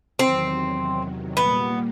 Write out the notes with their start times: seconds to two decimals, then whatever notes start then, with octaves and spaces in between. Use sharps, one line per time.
0.19 E2 C3 D#3 F#3 C4
1.37 A#2 G3 A#3 B3